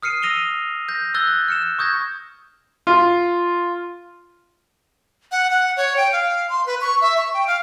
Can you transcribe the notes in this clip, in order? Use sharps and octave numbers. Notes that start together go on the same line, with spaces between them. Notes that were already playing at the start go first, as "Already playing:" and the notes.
D#6 F6 C7 C#7 D#7
D#6 E6 A#6 D#7 F7 G7
G6 A#6
E6 F#6 A6 G7
F6 C#7 E7
C#6 D#6 G6 G#6 A#6
F4
F#5
F#5
C#5
G5
F5
C6
B4
C#6
E5
C#6
G5
F5